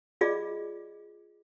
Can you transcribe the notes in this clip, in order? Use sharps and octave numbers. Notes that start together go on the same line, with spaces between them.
F4 G#4 D5 D#5 D6